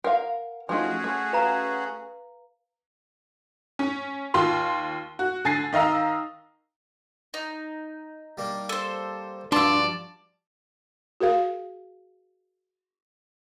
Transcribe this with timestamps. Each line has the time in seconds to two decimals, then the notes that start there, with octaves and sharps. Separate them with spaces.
0.04 A#4 F5 F#5
0.69 F3 A3 C#4 D#4 F#4 G#4
1.04 A3
1.33 B4 F5 A#5
3.79 C#4
4.34 D#2 F4 C6
5.19 F#4
5.45 D3 G#5 A6 C7
5.73 D#3 D#5 F5 A#5 E6
7.34 D#4
8.38 G3 A#3 D4
8.69 A4 C5
9.52 G2 F3 D4 F#4 D5 A5 C6 E6
11.20 F#4 G#4 A#4 F5